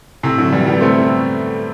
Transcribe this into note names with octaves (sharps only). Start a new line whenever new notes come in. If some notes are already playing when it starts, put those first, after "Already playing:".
A2 C3
D3 F#3
E3 G3
G3 B3
A3 C4